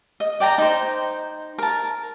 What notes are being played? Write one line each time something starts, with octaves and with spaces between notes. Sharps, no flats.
D#5
D5 G5 A5 A#5
D#4 C5
A#4 A5